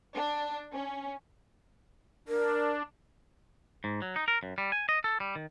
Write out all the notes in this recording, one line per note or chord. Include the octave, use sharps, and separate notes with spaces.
D4
C#4
D4 A#4
G#2
F#3
D#4
A#4
F#2
G3
G#5
D#5
A4
G3
D#3